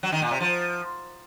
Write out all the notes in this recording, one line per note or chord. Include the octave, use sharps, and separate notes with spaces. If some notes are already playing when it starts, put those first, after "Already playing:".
F#3
D#3
A#2
C3
F3